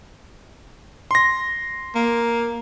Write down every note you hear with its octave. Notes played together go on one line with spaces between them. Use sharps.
C6 A#6
A#3